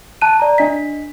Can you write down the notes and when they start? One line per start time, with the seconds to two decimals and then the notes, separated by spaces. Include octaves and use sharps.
0.22 A5 F#6 D#7
0.40 D5 A#5
0.58 D4 D#5 B6